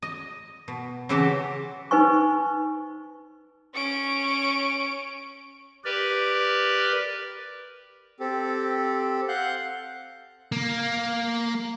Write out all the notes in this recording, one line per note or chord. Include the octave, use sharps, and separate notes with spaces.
D#5
B2
C#3 E3 C4 F#4 G4 A5
D#4 B4 C5 G#5 C#6
C#4 D7
G4 A#4 B4 D5
C4 G4 A4
F5 F#5 F#6 G6
A#3